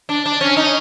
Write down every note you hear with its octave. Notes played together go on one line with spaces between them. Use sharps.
D4
D4
C#4
D#4